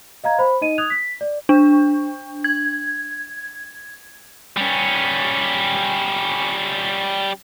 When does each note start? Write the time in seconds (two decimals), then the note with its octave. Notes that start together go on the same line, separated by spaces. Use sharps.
0.24 D#5 F5 A#5 G#6
0.39 C5 B5
0.62 D#4 D#5 D#7
0.78 D#6 F#6 G#6 F7
0.90 B6
1.21 D5
1.49 D4
2.44 G#6
4.57 G3 C#4